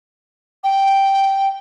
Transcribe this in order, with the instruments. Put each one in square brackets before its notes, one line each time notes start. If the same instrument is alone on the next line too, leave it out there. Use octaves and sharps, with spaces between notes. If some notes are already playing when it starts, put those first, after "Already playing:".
[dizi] G5